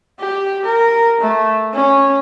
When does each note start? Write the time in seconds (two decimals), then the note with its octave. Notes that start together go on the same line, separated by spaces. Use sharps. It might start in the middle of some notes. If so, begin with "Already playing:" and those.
0.19 G4
0.65 A#4
1.20 A3
1.74 C#4